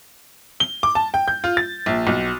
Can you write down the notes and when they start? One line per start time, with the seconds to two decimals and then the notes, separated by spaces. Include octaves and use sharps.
0.60 G7
0.83 D6
0.95 A5
1.14 G5
1.28 G6
1.44 F4
1.57 A6
1.86 A#1
2.07 B1